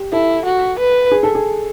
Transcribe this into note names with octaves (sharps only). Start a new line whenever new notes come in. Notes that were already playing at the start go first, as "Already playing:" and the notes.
Already playing: G4
E4 A4
F#4
B4
G#4
A4
G#4